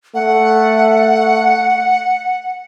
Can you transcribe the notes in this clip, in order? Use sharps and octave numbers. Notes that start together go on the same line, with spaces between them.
A3 F#5